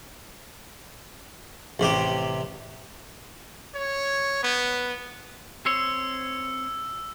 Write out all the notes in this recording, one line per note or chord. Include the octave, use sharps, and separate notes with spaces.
A1 C3 G4
C#5
B3
C4 C5 C#5 E6